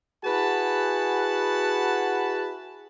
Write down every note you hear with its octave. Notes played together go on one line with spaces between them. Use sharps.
E4 F#4 G#4 B4 F#5 A5